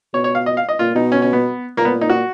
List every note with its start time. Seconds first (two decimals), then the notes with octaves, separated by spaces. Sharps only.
0.14 B2 C#5
0.24 C#5
0.35 F5
0.46 D#5
0.57 F5
0.69 D#5
0.79 A#2 F4
0.95 B2 D#4
1.12 C#4
1.22 C#4
1.33 B3
1.77 A#2 A#3
1.85 B3
2.01 D#4
2.10 F#4